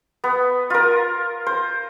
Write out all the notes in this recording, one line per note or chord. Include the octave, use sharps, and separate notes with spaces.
B3
F4 A#4
C5